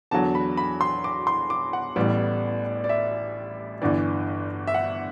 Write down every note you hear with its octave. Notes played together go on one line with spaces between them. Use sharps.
E2 D3 F#3 A5
B5
B5
C6
D6
C6
D6
F#5
A1 A2 G3 B3
D5
E5
G1 G2 E3 D5
E5
F#5